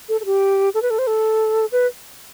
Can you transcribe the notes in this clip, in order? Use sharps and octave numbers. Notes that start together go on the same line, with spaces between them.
A4
A4
G4
A4
B4
A4
C5
A4
B4